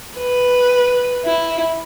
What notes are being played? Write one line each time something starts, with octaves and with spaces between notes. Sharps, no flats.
B4
E4